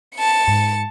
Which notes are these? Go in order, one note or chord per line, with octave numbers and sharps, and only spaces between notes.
A5 C#7
G#2